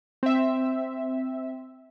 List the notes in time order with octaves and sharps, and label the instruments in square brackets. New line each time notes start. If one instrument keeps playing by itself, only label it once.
[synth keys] C4 E5